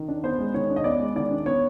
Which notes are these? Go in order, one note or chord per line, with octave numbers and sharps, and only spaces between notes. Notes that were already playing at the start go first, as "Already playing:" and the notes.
Already playing: D#3
D4
B3 C5
G#3
D#3 C#5
D4
D#5
B3 D5
G#3
D#3 D5
D4
B3 C#5